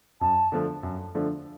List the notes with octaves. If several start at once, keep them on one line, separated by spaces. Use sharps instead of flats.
F#2 A5
D3 F3 A3 D4
F#2
D3 F3 A3 D4